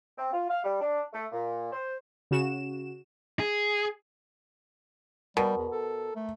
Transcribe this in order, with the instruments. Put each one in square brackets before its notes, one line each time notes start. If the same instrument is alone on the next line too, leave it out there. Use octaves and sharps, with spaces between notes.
[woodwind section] C4
F4
F5
G3
D4
A3
A#2
C5
[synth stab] C#3 F#4 E7
[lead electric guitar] G#4
[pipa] B2 [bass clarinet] G3 [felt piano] A#4
[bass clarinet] E2
A4
A3